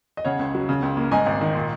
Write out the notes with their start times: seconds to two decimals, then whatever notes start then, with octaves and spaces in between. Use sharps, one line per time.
0.17 D#5
0.25 C#3 C#5 F#5
0.39 C#2
0.55 F#3
0.69 C#3
0.82 C#2
0.97 A#3
1.11 G#2 D#5 G#5
1.26 G#1
1.41 D#3
1.55 A#2